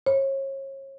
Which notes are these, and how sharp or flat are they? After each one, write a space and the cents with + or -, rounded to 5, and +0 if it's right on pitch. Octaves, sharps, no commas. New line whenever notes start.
C#5 -35